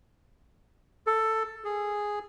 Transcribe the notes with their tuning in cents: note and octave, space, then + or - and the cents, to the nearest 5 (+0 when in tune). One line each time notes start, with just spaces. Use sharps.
A4 +10
G#4 -5